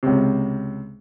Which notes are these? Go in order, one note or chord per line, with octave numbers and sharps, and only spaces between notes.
C#2 C3